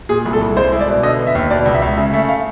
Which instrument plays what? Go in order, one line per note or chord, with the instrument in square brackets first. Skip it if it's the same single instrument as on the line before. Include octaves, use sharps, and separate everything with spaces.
[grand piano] A#2 [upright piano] G#4
[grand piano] C2
[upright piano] A4
[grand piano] C2
[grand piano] G#3 [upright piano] C5
[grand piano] E4
[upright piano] D5
[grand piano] B2
[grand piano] D3 [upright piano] D#5
[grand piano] B3
[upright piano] E5
[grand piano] D#2
[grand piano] B2 [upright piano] D5
[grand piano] C#2
[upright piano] E5
[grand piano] C#2
[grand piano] C#3 [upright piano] E5
[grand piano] A3 [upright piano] E5
[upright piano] F5